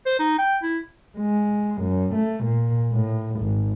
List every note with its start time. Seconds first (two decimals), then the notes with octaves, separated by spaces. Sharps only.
0.06 C5
0.19 D#4
0.39 G5
0.63 E4
1.18 G#3
1.82 F#2
2.15 A3
2.45 A#2
2.93 A2
3.41 G#1